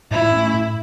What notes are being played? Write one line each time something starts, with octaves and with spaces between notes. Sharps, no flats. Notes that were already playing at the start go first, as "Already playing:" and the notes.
A2 E4
A3 C#4
A2